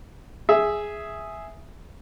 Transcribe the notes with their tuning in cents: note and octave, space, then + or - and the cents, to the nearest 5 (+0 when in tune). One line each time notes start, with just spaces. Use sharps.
G#4 +0 E5 +0